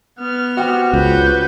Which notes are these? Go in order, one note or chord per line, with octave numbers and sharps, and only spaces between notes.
B3 F6
C4 F#4 G4 F#5
C#2 B4 G6